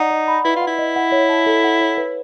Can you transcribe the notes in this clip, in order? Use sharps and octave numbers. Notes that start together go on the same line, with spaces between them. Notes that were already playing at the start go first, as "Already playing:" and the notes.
Already playing: D#4 D5 F#5
D#5
B5
E4 B4
F4
F#5
E4
D#5
F#5
C#5
A5
A4
F#5
C#5
B4